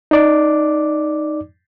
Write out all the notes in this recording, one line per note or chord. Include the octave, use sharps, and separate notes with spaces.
D#4 D5 D6